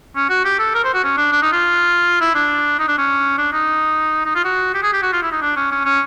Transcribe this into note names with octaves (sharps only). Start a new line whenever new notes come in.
C#4
F#4
G4
A4
A#4
C5
F#4
C#4
D4
D4
D#4
F4
E4
D4
D#4
D4
C#4
D4
D#4
D#4
F4
F#4
G4
G#4
G4
F#4
F4
E4
D#4
D4
C#4
C#4
C#4